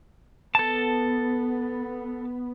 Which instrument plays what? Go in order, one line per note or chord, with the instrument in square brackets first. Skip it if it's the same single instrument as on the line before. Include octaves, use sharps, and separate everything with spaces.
[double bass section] B3 [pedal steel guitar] A4 A5